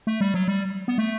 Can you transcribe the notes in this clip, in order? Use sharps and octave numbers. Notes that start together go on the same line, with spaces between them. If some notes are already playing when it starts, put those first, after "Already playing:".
A3
G3
F#3
G3
B3
A3